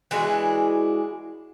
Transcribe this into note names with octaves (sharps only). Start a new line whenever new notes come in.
E3 G#3 D4 F#4